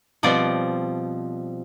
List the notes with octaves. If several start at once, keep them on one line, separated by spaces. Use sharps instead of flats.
B2 F3 G3 C4 D5